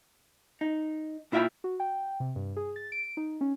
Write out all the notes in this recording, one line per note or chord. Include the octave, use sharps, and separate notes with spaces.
D#4
A#2 E4 F4 E5 G5 B5
F#4
G5
C3
G2
G#4
A6
D7
D#4
C#4